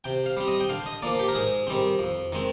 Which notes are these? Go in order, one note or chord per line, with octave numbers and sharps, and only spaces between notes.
C3 G5
F5
G3 C4
D#5
G5
D3 F5
D#5
F3 A#3 D5
G4
A#4
G#2 G#4
D#3 G3 C4
F2
D#3 G#3 C4